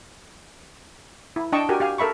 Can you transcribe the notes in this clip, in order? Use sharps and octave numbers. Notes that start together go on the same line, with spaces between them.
E4
D4 D#5 G5 A5 C#6
F#4 G4 A#4 G#5
G4 F5 G#5
A4 A#4 E5 B5 C#6